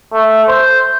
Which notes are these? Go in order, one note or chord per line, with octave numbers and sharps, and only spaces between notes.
A3
C5